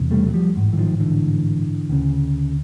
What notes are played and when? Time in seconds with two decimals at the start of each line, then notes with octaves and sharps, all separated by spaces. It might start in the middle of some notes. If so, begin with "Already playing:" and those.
Already playing: E1 E2 C3
0.11 G3 A3
0.26 F#3
0.34 F3 G3
0.56 A1 G#2
0.73 E3
0.78 D#3 F3
1.00 D3 E3
1.90 D2 C#3